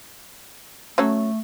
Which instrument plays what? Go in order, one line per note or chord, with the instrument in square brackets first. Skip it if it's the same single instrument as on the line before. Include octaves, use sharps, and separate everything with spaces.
[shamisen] F#3 C#4 A4 [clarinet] A3